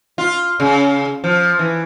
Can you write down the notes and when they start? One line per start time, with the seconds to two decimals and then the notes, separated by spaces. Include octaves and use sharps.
0.18 F4
0.60 C#3
1.24 F3
1.59 E3